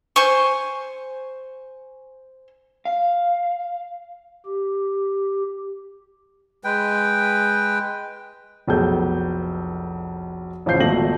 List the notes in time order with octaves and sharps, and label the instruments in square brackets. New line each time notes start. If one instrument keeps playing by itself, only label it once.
[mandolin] C5 G#5 C#6
[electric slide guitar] F5
[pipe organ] G4
[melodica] G#3 B4 G5
[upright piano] F1 B1 B3 G#4 A4 G6
A1 C#3 F3 F5 G6 C7
D#1 G#1 B2 A3 A#6 F#7